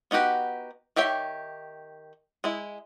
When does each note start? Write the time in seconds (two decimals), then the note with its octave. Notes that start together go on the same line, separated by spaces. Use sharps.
0.11 B3 D#4 F#4 G4 B4
0.96 D#3 G4 C#5 E5 G5
2.44 G#3 E4